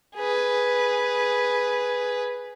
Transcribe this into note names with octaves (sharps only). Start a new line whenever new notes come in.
G#4 B4